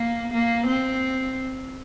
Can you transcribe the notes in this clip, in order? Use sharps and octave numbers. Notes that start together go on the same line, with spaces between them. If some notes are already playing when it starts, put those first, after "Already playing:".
Already playing: A#3
A#3
C4